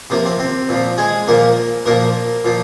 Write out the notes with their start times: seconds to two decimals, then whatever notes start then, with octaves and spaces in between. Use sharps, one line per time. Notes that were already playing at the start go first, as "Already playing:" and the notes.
0.10 C3 F3 A#3
0.26 C4
0.39 C4
0.69 A#2 F3
0.98 G#3 G#4
1.27 A#2 F3 A#3 A#4
1.86 A#2 F3 A#3 A#4
2.45 A#2 F3